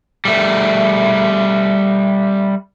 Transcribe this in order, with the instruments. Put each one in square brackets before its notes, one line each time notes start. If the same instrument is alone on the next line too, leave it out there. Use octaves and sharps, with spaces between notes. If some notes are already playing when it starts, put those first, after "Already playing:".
[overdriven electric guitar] G3 A3